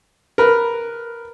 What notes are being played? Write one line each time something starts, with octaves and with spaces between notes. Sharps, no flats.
A#4 B4